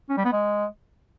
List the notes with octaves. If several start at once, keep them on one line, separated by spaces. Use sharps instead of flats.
C#4
G3
B3
G#3